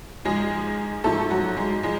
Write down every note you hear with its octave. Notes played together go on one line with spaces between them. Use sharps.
G#2 F3 G#3 G#4
G#2 F3 A3 A4
F#3 F#4
G#3
F3 G#3